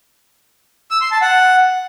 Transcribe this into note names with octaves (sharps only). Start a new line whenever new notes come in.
E6
C6
A5
F#5